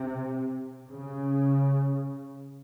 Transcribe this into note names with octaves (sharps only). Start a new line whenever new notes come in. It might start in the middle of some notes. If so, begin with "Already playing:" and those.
Already playing: C3
C#3